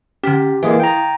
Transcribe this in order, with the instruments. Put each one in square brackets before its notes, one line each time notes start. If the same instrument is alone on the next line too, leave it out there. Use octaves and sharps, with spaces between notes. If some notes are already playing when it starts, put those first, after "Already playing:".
[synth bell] D3 C#4 [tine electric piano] G4
[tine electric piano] E3 G#3 A#3 [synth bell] E4 F5 D#6
[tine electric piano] G5 A#5